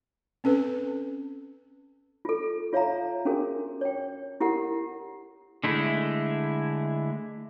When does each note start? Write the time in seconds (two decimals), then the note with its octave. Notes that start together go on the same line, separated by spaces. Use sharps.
0.44 C4 C#4 A4 B4
2.25 F4 A4
2.73 F4 C#5 E5 F5 A#5
3.25 C#4 D4 F#4 G#4 A#4
3.81 C#5 G5
4.40 E4 G4 A#4 F#5
5.64 D3 G#3 A3 E4